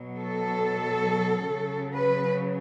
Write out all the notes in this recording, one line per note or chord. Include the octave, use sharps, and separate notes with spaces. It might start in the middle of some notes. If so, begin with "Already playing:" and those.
Already playing: B2 F#3
A4
C#3 F#3
B4